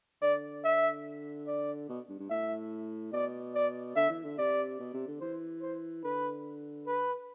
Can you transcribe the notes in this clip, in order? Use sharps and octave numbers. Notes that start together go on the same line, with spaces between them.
D3 D5
E5
D5
B2
G2
G2
A2 E5
B2 D5
D5
D3 E5
E3
D3
C3 D5
B2
C3
D3
E3 C5
C5
D3 B4
B4